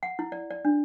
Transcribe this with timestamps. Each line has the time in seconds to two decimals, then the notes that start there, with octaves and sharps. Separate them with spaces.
0.03 F#5
0.19 E4
0.32 D5
0.51 D5
0.65 D4